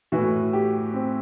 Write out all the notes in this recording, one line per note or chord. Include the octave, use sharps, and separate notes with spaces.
A2 E3 F#4
G4
C4